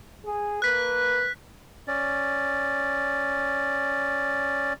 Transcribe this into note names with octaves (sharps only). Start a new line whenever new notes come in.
G#4
A#3 B4 F#6 B6
C#4 D5